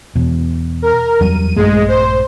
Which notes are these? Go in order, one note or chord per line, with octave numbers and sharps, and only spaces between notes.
E2 B2
A#4
E2 F#3 G3 D#7
A#1 G2 G#3 A3
C5